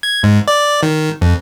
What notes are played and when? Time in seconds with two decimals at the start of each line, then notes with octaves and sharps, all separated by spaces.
0.03 G#6
0.23 G#2
0.48 D5
0.83 D#3
1.21 F2